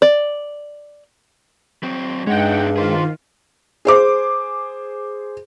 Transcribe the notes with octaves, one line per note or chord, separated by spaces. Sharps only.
D5
F#3 C4
G2 G#3 C#4 D#4 F#5 G5
D#3 F4 G#4 C5
G#4 C5 D6